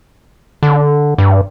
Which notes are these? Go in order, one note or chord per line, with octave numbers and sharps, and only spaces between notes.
D3
G2